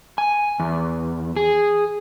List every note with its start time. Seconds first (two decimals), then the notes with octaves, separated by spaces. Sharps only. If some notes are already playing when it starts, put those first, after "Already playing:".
0.18 G#5
0.60 E2
1.36 G#4